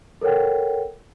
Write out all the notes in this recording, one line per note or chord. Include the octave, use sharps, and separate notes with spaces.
A4 A#4 C#5 F#5 G5